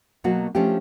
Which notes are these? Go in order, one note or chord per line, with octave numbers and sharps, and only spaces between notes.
B2 F#3 A#3 F#4
F3 A3 C#4 D4 G4